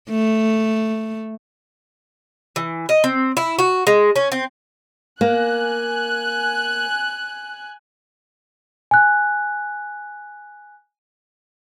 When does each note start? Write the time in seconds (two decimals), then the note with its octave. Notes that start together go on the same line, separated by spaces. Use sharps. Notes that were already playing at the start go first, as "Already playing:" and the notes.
0.10 A3
2.56 E3
2.89 D#5
3.04 C4
3.37 E4
3.59 F#4
3.87 G#3
4.16 C#4
4.32 C4
5.21 A#3 G#5 F#6
8.91 G#5 F#6